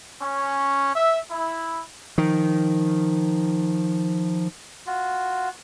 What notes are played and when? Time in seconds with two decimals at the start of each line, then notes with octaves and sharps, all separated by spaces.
0.20 C#4
0.95 E5
1.30 E4
2.18 D#3 F3
4.87 F4 F#4